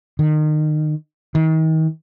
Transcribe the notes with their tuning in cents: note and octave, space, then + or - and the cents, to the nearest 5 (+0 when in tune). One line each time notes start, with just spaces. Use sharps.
D#3 -30
D#3 +35